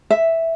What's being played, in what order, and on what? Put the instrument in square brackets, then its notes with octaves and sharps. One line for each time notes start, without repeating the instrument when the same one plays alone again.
[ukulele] E5